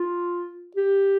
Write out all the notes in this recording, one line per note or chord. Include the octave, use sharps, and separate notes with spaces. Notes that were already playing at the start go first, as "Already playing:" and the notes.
Already playing: F4
G4